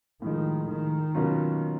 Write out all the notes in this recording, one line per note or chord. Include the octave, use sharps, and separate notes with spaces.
A2 D#3 F3 G#3
D#3
B2 F#3 A#3 C#4 F4